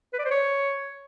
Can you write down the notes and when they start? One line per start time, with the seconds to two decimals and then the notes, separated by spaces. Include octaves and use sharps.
0.13 B4
0.19 D5
0.25 C5
0.31 C#5